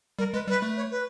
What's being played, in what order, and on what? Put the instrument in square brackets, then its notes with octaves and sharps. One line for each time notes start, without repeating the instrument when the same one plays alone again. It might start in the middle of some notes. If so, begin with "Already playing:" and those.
[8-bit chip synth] G3 [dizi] A#4
[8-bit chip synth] G#3 [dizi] B4
[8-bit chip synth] G3 [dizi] B4
[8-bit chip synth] A3
[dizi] C#5
B4